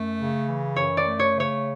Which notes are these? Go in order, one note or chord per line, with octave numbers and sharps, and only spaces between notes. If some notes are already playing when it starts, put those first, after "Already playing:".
Already playing: F#2 A3
C#3
E3
F#2 C#5
D5
A3
C#5
C#3
C#5